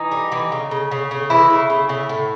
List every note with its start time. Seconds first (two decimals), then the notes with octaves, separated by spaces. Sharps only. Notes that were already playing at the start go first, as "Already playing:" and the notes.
Already playing: E3 D#4
0.12 G3
0.32 E3
0.52 C#3
0.71 C#3
0.91 C#3
1.11 C#3
1.30 E3 G#3 E4
1.50 C#3
1.70 C#3
1.89 C#3
2.09 A2